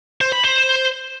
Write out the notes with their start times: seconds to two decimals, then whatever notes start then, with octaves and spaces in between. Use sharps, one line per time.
0.21 C5
0.32 B5
0.44 C5